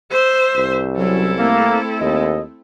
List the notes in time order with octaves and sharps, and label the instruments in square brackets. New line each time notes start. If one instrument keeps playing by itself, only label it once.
[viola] C5 E5
[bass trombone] C2
[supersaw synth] F#3 C#4 [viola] E4 A4
[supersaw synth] A3 C4 [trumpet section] A#3
[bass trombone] D#2 [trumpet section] D#5